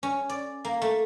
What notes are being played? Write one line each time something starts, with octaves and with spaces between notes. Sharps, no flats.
C#4
D5
A#3
A3